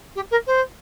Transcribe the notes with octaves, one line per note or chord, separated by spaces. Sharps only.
G4
A#4
C5